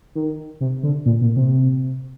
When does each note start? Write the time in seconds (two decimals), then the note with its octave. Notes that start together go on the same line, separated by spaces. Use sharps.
0.15 D#3
0.61 C3
0.83 D3
1.06 A#2
1.21 A#2
1.36 C3